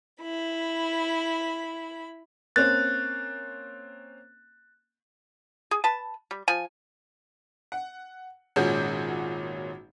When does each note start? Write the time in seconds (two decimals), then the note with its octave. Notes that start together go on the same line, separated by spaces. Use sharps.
0.22 E4 B5
2.56 A#3 C4 C#4 F#6 A6
5.71 G#4
5.84 B4 A5
6.31 G3
6.48 F3 G#5
7.72 F#5
8.56 G#1 A#2 C#4 F#4 G#4 G6